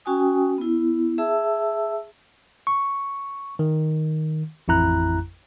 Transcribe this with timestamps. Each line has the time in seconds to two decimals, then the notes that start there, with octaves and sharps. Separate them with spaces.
0.05 C#4 F#4 G5 G#5 D#6
0.58 B3 E4
1.18 G#4 E5 A5 E6
2.67 C#6
3.59 D#3
4.68 A1 F2 E4 A#5 F#6